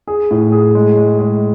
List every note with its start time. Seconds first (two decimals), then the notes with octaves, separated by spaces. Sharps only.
0.07 G#4
0.31 A2
0.52 G#4
0.75 G#3
0.97 G#3
1.19 G#3